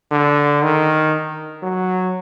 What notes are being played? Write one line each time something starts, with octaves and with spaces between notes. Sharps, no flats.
D3
D#3
F#3